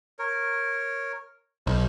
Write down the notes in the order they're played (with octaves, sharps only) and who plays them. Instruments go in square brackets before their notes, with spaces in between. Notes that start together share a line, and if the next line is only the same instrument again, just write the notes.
[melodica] A#4 C#5
[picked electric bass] B1 [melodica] C5